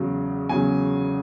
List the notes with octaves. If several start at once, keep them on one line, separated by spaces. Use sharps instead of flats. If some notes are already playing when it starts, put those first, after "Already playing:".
Already playing: E2 C#3 F#3
E2 C#3 F#3 G#5